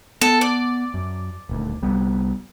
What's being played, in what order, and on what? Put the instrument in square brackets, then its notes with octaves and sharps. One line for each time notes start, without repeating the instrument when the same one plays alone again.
[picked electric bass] B3 [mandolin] A4
[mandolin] D5
[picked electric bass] F#2
D#1 D2
C2 G3 B3